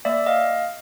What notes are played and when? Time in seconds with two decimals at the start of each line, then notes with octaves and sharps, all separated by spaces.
0.05 A#3 D5 E5
0.26 D#5 F5